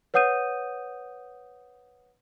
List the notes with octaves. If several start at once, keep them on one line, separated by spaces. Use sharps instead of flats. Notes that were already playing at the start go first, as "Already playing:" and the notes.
B4 C#5 F#5 D#6 G6 D#7